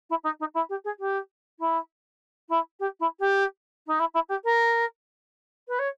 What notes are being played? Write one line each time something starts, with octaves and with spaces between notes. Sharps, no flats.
E4
D#4
D#4
E4
G4
G#4
G4
E4
E4
G4
E4
G4
D#4
E4
E4
G4
A#4
B4
C#5